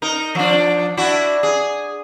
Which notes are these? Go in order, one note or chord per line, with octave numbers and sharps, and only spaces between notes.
D#4 A#4
F3 D4
D4 E4 F#4
G#4